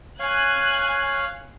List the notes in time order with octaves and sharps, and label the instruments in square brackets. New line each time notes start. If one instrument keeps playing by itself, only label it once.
[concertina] C#5 F5 [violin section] G#5 F#6